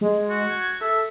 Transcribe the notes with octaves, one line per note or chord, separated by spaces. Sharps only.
G#3
F#4
G#6
A4 E5